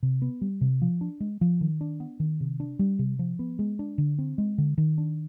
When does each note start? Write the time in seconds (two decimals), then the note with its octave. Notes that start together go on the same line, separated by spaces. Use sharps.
0.03 C3
0.22 B3
0.41 G3
0.61 C3
0.82 F3
1.01 D4
1.20 G#3
1.41 F3
1.61 D#3
1.81 D4
2.00 B3
2.20 D#3
2.40 C3
2.60 D4
2.79 G3
2.99 C3
3.19 F3
3.39 B3
3.59 G#3
3.79 D4
3.98 D3
4.19 C4
4.38 G#3
4.58 D3
4.78 D#3
4.98 D4